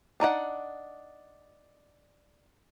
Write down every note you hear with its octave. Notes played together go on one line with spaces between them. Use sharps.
D4 D#4 D5 F#5